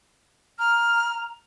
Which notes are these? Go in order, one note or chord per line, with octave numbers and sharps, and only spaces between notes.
A#5 F6